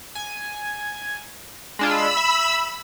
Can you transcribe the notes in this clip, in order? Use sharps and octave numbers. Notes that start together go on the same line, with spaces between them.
G#5
G#3 D4 F4 B5 E6
E5